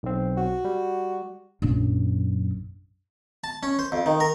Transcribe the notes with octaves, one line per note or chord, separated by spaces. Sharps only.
B1 C4
F#4
G3
A#1 F#2
A5
C#4
C5
F2
D#3
A#4